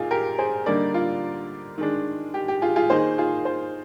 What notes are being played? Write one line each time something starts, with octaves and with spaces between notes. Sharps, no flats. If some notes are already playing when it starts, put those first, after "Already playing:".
Already playing: A#2 D#4 F4 G#4
G4 A#4
G#4 C5
D3 G3 A#3 D#4 A#4 D5
F4
D#3 G#3 D4
G4
G4
F4 G#4
F4 G#4
D#3 A#3 D#4 G#4 C5
F4 G#4
G#4 C5